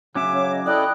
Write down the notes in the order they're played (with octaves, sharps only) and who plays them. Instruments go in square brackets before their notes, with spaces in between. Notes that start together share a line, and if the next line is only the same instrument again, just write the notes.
[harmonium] C#3 [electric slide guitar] F#3 C#4 E5 [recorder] D6
[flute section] C#5 F5
D#5
[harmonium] E4 A4 D#5 [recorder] D5 [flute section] G5 D#6 F#6